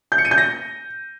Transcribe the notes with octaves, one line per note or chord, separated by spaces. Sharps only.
G6
C#7
D#7
G6
A#6